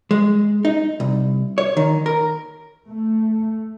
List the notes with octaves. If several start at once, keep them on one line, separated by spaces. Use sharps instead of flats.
G#3
D#4
C2
C#5
D#3
A#4
A3